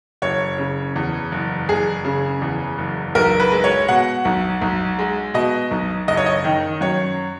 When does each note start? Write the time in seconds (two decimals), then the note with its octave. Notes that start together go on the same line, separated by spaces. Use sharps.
0.22 F#1 C#5
0.58 C#3
0.96 E2
1.32 F#1
1.69 F#1 G#4
2.05 C#3
2.42 E2
2.78 F#1
3.15 B1 A#4
3.40 B4
3.52 G#3
3.64 C#5
3.88 B2 F#5
4.25 B1
4.61 B1
4.99 G#3
5.34 B2 D#5
5.71 B1
6.08 F#1 D#5
6.17 C#5
6.26 D#5
6.44 D#3
6.81 F#2 C#5